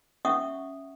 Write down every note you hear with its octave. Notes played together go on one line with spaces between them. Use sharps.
C#4 E5 F#5 C#6 D#6